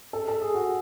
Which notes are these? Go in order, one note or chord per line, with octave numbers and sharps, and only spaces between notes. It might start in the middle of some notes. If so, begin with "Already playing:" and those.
A4
A4
G#4
F#4